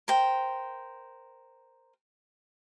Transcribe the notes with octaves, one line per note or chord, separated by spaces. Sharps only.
A#4 C5 G5